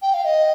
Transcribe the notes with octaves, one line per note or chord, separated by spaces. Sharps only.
G5
F5
D#5